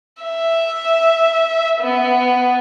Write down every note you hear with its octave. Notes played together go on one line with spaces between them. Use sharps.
E5
B3